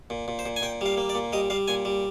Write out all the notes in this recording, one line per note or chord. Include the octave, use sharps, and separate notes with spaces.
A#2
A#2
C5
A#2
G#5
A#2 G5
G3 F5
A#3
D5
A#2
G3 D#5
G3 F5
A#2 G#5
G3